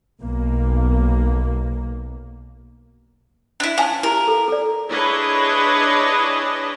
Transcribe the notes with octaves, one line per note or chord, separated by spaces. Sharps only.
B1 B2 A#3
D4 E4
C#4 F5 G#5 A5
E4 G4 A#4
A4
A4 D5
D4 E4 G#4 B4 C#5 D#5